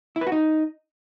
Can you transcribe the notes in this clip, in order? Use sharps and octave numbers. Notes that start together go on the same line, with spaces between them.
E4
B4
F#4
D#4